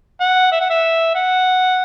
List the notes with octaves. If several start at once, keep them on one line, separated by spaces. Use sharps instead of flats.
F#5
E5
F#5
E5
F#5